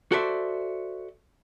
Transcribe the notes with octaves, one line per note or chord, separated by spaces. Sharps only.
F#4 A4 C5 D5 E5